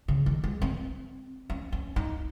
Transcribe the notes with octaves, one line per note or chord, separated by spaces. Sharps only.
C#3
D#3
G#3
C4
C#4
C#4
D#4